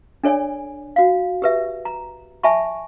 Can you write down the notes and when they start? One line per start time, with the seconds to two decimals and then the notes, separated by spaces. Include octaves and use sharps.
0.24 D4 A4 C#5 D5 G#5
0.96 F#4 F5
1.42 G4 B4 E5
1.85 A#5
2.43 E5 G#5 A5 B5 C#6